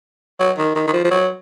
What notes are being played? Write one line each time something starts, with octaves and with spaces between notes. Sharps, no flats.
F#3
D#3
D#3
D#3
F3
F3
F#3